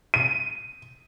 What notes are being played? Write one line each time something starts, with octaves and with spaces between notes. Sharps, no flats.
D#7